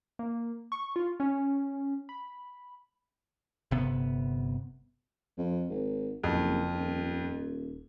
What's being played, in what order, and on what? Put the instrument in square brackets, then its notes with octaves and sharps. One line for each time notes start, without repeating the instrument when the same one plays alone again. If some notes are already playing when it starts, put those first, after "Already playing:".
[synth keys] A#3
C#6
F4
C#4
B5
[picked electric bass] G1 C3 B3
[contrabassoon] F2
G#1
[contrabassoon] F#1 [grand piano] F2
[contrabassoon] D#1